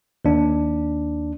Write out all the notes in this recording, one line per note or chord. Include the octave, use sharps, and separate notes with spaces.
D#2 D4